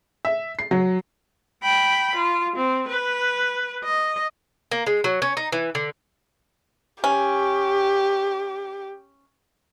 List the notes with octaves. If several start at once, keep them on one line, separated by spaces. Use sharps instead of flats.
E5
C7
F#3
G5 B5
F4
C4
B4
D#5
A#3
G#3
F#3
C#4
D#4
E3
D3
C#4 G4